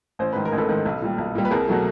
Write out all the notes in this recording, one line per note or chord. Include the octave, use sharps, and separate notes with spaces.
A1 C5
G#2 D#3 B4
A#4
A1
A4 B4
G#2 D#3
B1
A#2 G3
B1
A#2 G3
B4
C2 G#4 A#4
B2 F#3 A3